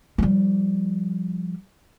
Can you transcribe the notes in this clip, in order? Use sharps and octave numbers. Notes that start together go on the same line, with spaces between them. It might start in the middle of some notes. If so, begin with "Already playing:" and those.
F3 G3